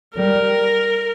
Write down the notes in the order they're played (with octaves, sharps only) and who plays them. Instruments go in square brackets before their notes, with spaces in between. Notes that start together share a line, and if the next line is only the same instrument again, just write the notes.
[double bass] G3 [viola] A#4